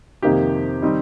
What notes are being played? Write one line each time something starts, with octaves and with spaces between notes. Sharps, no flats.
F2 C3 D#3 A#3 D#4 G4
D#3 G3 C4 D#4